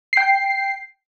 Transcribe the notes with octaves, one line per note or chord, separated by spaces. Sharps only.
G5 C7